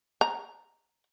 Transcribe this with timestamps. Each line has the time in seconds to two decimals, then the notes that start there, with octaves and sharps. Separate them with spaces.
0.21 A#5